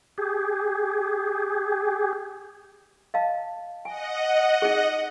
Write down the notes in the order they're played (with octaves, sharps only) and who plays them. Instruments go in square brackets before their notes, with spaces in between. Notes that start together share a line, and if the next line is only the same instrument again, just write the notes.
[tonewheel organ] G4 G#4
[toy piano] D#5 F5 A5
[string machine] D#5 F#5 [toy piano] G#5
[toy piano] D#4 G#4